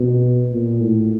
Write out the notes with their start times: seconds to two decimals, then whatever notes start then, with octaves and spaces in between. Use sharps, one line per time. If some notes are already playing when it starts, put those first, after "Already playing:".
Already playing: B2
0.51 A#2
0.80 A2